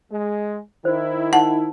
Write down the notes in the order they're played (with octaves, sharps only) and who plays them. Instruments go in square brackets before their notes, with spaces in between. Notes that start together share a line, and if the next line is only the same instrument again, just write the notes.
[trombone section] G#3
[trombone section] D#3 E4 [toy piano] C5
[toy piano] D#4 [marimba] F#5